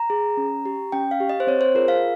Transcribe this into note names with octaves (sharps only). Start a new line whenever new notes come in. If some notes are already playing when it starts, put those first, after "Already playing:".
Already playing: A#5
G#4
C#4
G4
C#4 G5
F5
G4
D#5
C5
C4 C#5
C5
F4 G#4 A#4
F5